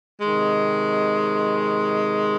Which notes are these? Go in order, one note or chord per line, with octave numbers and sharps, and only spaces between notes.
C3 D#3 G#3